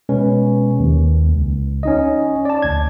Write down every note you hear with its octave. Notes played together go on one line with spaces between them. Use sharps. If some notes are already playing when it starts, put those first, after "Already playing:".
B2 G#3 C#4 B4
D#2
C#2
C#4 D#4 D#5
D5 A5
D2 G#6